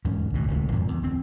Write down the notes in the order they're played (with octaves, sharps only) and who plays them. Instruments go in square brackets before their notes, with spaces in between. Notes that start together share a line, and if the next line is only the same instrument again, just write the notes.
[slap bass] E2 G#2 C#4
G#1 D2 B2
D1 C#2 C3
G#1 F2 A#2
E2
D2 C4